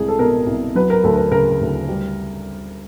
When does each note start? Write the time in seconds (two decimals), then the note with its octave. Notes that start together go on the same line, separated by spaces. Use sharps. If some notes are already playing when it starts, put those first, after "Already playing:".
Already playing: C2 G#3 G#4
0.08 A4
0.19 B2 A#4
0.46 C2
0.75 F#3 B4
0.90 A#4
1.04 D2 A4
1.17 A#4
1.31 C#3 A#4
1.61 D2
1.88 G3